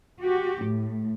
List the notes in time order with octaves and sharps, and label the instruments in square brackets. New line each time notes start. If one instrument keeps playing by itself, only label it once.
[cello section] F#4 G4
A2